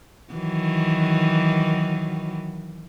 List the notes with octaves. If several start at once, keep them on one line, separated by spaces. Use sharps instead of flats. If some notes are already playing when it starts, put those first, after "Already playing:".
D#3 E3 F#3